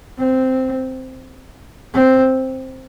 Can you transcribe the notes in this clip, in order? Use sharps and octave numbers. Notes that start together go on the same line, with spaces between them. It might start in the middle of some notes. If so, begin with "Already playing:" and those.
C4
C4